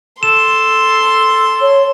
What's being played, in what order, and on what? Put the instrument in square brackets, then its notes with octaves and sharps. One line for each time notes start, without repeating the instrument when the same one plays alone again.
[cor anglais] A4 [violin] C6 [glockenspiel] E7
[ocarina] C#5